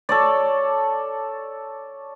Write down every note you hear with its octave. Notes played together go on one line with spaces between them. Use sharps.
A4 C#5 D5